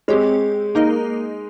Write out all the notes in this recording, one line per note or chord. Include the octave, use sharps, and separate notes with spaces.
G#3 C4 G4 C#5
A#3 D#4 A#4 D#5